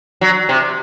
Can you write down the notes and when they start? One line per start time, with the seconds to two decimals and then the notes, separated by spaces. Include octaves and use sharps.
0.21 F#3
0.49 C3